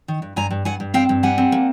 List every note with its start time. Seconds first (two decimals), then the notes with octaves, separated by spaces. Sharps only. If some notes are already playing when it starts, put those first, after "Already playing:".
0.08 D#3
0.22 G2
0.36 G2 G#5 A#5
0.51 G2
0.65 G2 F#5 G#5
0.80 G2
0.94 C4 F5 G5
1.09 G2
1.23 G3 F#5 G#5
1.38 C4
1.52 A#3